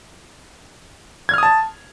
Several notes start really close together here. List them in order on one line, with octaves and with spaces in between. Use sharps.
G#6 F6 D#6 A5